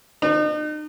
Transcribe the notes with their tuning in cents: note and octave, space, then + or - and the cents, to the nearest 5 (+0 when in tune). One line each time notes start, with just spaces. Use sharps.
D#4 -40